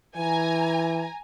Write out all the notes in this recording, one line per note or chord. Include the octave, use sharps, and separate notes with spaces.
E3 G#5 A#5